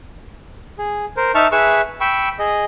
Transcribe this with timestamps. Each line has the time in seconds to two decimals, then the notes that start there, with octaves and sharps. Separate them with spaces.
0.78 G#4
1.17 A#4 C5
1.35 D#4 E5 A5 C#6 F6
1.52 G#4 B4 E5 C#6 E6
2.01 G5 B5 C#6 E6
2.39 G#4 D#5